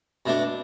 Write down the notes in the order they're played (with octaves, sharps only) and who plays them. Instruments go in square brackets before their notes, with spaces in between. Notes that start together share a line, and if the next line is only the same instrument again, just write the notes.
[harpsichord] B2 A3 D4